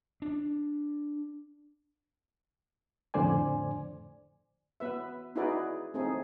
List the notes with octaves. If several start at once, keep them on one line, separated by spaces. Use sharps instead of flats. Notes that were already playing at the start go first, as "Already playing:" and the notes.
D4
F2 A2 D3 C5 D5 G#5
B3 B4 E5
D#4 E4 F#4 G#4 B4 D5
A3 C4 D#4 G#4